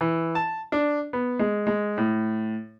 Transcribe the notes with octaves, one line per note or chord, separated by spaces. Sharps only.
E3
A5
D4
B3
G#3
G#3
A2